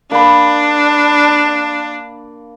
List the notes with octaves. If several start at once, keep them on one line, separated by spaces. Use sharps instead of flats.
A#3 D4 B5